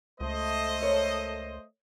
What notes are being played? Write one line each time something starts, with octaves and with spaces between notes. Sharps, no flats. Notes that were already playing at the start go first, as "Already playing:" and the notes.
C#2 A3 C5 D#5
A#4 C#5